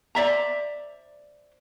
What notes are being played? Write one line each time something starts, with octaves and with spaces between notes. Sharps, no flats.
C5 D5 E5 A#5